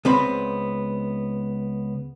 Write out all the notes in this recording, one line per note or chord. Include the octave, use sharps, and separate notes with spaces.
C#2 B3 C4 B5